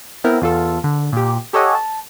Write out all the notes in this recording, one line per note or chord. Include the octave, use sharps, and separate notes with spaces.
B3 C4 E4 A#4
E2 F4 A4
D3
A#2 G4
G4 A4 C#5 D#5 F#5 G#5
A5